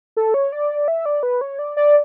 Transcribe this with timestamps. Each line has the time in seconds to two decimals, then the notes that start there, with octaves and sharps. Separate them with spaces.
0.17 A4
0.34 C#5
0.52 D5
0.88 E5
1.06 D5
1.23 B4
1.41 C#5
1.59 D5
1.77 D5